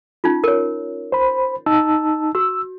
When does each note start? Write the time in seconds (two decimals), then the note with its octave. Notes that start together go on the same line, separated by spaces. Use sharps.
0.24 C#4 D#4 F4
0.44 A#4 C#5
1.12 C5 B5
1.66 D#4 A5 E6
2.35 F#4 E6